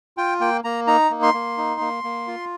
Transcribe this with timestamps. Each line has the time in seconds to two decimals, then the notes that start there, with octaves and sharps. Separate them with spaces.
0.17 F4 G5
0.40 A#3 G5
0.64 A#3 A#5
0.87 D#4 A#5
1.11 A#3
1.23 C6
1.34 A#3
1.57 D#4
1.81 A#3
2.04 A#3
2.27 F4